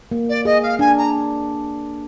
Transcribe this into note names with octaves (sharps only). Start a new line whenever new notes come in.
A#3
D5
G#4 D#5
F5
D4 G#5
A#5